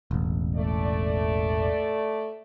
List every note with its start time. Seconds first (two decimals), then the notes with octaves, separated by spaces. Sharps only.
0.11 E1 A1
0.56 A3 D5